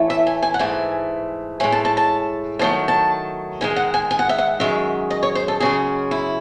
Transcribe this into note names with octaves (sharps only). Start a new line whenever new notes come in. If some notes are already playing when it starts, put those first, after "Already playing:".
Already playing: A2 E3 A3
E5
G#5
G#5
F#5
G#2 E3 A3 G#5
A2 G#3 G#5
A5
A5
A5
G#2 D#3 F#3 A3 A5
A5
G#2 D#3 G#3 G#5
F#5
G#5
G#5
F#5
E5
F#5
F#2 D#3 G#3 E5
D#5
C#5
C5
A4
F#2 C#3 G#3 G#4
E4